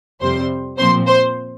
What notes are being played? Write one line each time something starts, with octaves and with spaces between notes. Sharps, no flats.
F2 C3 G3 C4 C5 C6
A#2 F3 C4 C5 C6
C5 C6